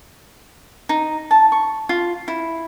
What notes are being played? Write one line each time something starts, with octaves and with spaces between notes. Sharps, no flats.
D#4
A5
C#6
F4
E4